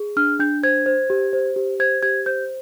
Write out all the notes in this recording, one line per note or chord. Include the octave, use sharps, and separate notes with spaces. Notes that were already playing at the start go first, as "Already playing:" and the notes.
Already playing: G#4
D4 F6
D4 G6
C5 G#6
C5
G4
C5
G4
C5 G#6
G4 G#6
C5 G6